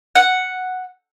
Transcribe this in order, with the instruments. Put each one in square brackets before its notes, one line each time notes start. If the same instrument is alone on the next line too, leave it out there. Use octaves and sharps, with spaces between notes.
[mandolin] F#5